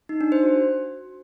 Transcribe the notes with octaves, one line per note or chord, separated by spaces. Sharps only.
D#4
D4
C5
F#4